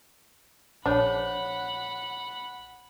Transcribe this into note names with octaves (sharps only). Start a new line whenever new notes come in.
A#1 D4 G#4 C5 C#5 F#5 B5